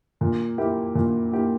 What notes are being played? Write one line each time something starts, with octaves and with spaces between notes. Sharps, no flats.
A#2
A#3 E4 G4
A#2
A#3 E4 G4